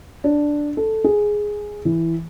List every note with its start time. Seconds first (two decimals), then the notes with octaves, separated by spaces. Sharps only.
0.24 D4
0.77 A4
1.04 G#4
1.85 E3